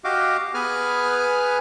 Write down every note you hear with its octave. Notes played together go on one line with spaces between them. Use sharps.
F#4 G4 D#5 F5 D6
B3 G#4 B4 G#5 F6